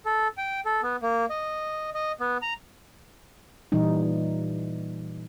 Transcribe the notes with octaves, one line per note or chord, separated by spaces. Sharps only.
A4
G5
A4
B3
A#3
D#5
D#5
B3
A#5
A#2 E3 G3 D#4